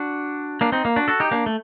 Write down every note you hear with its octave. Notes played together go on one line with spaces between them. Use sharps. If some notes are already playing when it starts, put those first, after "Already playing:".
Already playing: D4 F#4
A#3 D4
C4 D#4
A#3
D4 F#4
F#4 A4
D#4 G4
A#3 D4
A3